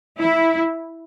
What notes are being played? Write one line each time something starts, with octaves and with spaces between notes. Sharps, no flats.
E4